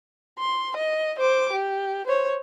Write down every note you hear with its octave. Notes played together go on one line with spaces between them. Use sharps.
C6
D#5
C5 D6
G4
C5 C#5